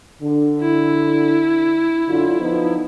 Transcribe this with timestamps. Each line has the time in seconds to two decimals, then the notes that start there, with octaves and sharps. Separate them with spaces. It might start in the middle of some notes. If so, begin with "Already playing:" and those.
0.22 D3
0.61 E4
2.08 F#2 D3 F4
2.39 F3 B3 D#4